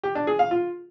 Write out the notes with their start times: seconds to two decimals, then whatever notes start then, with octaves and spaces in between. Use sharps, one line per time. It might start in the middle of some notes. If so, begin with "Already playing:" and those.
0.03 G4
0.15 D4
0.27 G#4
0.39 F5
0.51 F4